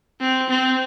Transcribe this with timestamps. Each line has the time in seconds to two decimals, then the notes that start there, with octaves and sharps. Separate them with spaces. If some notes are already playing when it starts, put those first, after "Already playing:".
0.21 C4
0.50 C4